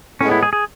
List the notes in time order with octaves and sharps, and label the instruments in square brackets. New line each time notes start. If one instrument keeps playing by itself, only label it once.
[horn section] A2 [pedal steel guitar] C#4
[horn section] G#3 B3
[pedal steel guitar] E4
G#4
G#4